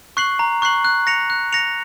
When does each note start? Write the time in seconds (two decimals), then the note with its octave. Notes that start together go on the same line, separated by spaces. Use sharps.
0.17 C#6 F#6 C7 F#7
0.39 A#5
0.62 C#6 F#6 C7 F#7
0.85 F#6
1.07 A#6 C#7 F7
1.30 F#6
1.52 A#6 C#7 F7